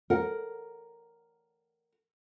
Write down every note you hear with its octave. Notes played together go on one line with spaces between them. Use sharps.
A#4 F#5